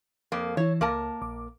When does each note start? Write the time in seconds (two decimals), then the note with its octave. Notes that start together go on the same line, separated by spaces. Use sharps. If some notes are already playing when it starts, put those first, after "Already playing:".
0.32 F2 A#3
0.57 E3 E4 C#5
0.81 C#2 A#3 A#4 A5
1.22 A#1 D6